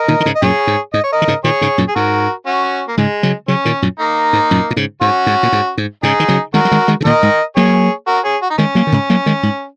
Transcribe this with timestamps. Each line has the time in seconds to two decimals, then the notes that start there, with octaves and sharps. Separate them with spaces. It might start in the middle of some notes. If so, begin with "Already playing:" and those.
Already playing: A#4 D#5
0.08 A#2 D#3
0.20 D#3
0.25 G#2 C#3
0.35 D#5
0.42 F#2 A#2 G#4 C#5
0.67 G#2
0.94 G#2 D#5
1.04 C#5
1.13 A#4 D#5
1.22 D#3
1.28 G#2 C#3
1.44 A#2 D#3 G#4 C#5
1.61 G#2 C#3
1.78 F#2 A#2
1.88 G#4
1.95 G#2 F#4 A#4
2.46 C#4 F#4
2.88 A#3
2.97 G#2 C#3 G#3
3.23 C#3 F#3
3.48 C#3 F#3 C#4
3.65 A#2 D#3
3.82 F#2 A#2
3.99 A#3 D#4
4.33 G#2
4.51 F#2 A#2
4.71 A#2
4.76 G#2 C#3
5.01 G#2 C#4 F#4
5.26 G#2
5.43 A#2
5.52 G#2
5.78 G#2
6.03 G#2 C#3 D#4 G#4
6.20 D#3
6.28 C#3 F#3
6.54 D#3 G#3 F#4 A#4
6.65 F#3
6.71 D#3 G#3
6.88 D#3 G#3
7.01 C#3
7.05 A#2 D#3 A#4 D#5
7.23 G#2
7.56 F#3 A#3 G#4 C#5
8.07 F#4 A#4
8.24 G#4 C#5
8.42 F#4
8.50 D#4
8.58 D#3 G#3 C#4
8.75 F#3 A#3
8.87 D#3
8.92 G#2 C#3
9.10 F#3 A#3
9.26 D#3 G#3
9.43 G#2